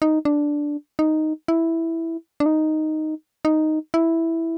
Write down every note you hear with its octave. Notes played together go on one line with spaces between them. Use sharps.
D#4
D4
D#4
E4
D4
D#4
D#4
E4